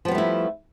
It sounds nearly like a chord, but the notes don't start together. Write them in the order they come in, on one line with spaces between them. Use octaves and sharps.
F3 B3 G3 A3 E4